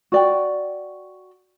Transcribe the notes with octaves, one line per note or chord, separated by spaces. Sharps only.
F#4 D5 G5